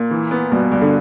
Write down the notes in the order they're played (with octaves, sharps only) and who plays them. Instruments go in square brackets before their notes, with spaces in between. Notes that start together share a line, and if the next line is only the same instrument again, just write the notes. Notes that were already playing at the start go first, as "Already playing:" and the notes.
Already playing: [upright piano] A#2
[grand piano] E3
B3
[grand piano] G2 [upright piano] B2
[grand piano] G2
[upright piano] D3